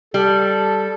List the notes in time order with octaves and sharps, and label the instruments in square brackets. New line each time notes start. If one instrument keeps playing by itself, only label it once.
[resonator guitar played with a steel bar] G3 [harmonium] A4